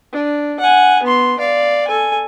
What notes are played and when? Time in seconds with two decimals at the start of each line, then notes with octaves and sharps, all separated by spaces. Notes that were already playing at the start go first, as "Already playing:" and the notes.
0.13 D4
0.60 F#5 G#5
1.03 B3 C6
1.39 D5 F5
1.87 A4 G#5